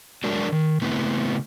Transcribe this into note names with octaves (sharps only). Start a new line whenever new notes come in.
F#3 G#3 D4 F#4 A#4
D#3
C#3 A3 B3 C4 E4